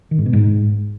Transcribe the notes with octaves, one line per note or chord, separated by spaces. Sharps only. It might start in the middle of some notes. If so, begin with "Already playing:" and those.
D#3
G#2
B2
G#2